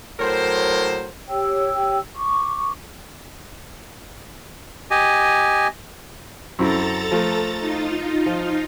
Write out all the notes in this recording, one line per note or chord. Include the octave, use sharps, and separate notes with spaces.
A2 F#3 A#4 C5
G4 C#5 G5 E6
C#6 D6
G4 D#5 G#5
F#2 C4 E4 A4 A#5 A6
F3 A3
D#4 F4
F3